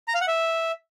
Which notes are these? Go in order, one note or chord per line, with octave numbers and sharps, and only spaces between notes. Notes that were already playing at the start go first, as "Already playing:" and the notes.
A#5
F5
F#5
E5